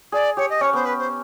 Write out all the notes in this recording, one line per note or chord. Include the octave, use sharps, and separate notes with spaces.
G#4 D5
G4 C#5
D#5
C#4 C#5
B3 C5
B4
C5